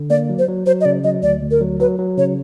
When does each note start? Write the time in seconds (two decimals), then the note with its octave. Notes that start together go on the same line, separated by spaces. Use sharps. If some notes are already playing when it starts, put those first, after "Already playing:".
Already playing: D3
0.10 A#3 D5
0.29 F#3
0.39 C5
0.48 F#3
0.66 F#3 C5
0.81 D#5
0.85 C#3 D5
1.04 F#3 D#5
1.23 D2 D5
1.42 D2
1.51 A#4
1.61 F#3
1.80 F#3 B4
1.99 F#3
2.18 C#3 C#5